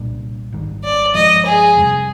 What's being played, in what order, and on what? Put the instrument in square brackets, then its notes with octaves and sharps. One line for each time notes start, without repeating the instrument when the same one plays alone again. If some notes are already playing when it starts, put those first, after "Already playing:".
Already playing: [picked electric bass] C2 A#2 G3 D4
G#1 G#2 D#3 G3
[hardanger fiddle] D5
[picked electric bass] G2 F3 G#3 [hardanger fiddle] D#5
[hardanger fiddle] G#4
[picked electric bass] F2 C3 G3